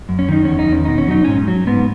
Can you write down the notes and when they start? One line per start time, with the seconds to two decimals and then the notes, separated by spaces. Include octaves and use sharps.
0.09 F#2
0.19 C#4
0.28 D#3 D#4
0.45 E2 C#4
0.59 D#4
0.68 E2 C#4
0.85 B2 D#4
0.98 C#4
1.08 F#3 D#4
1.24 G#2 C#4
1.48 F#3
1.67 G#2 B3